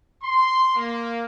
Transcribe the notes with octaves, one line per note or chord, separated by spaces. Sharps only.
C6
A#3